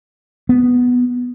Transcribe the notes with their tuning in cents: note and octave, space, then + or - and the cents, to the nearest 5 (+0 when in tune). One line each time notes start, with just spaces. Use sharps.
B3 +0